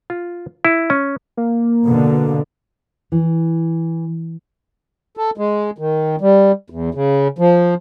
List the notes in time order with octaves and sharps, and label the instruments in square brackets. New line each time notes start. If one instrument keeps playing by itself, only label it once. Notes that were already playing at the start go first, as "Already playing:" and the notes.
[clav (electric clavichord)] F4
E4
C#4
[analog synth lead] A#3
[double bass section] B2 D3
[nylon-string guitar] E3
[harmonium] A4
G#3
D#3
G3
E2
C#3
F3